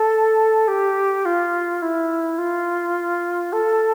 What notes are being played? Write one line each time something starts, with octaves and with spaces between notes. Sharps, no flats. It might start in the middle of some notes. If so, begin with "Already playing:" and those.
Already playing: A4
G4
F4
E4
F4
A4